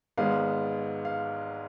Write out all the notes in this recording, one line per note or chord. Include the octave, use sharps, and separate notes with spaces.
G#1 G#2 G#3 B3 F5
F5